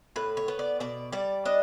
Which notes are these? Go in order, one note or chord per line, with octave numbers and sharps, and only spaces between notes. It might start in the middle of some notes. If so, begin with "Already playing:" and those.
A2 B4
C#5
B3
D5
B2 D5
G3 D5
D4 D#5